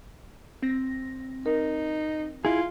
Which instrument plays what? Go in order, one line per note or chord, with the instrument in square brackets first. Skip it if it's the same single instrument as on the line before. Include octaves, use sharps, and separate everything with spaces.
[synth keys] C4 A#6
[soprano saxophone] D#4 [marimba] A#4
[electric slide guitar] E4 G#4 [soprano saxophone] F4